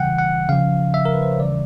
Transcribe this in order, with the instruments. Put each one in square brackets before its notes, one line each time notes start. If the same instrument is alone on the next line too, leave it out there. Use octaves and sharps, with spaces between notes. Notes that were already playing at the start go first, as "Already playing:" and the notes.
Already playing: [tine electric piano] C#3 E3 G3 F#5 G5
F#5
C#3 F3 F5
E5
A#4
B4
C5
C#5
C#3 E3 G3 D5